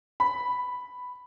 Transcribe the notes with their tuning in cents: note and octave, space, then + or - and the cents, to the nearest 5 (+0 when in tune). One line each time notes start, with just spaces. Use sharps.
B5 +0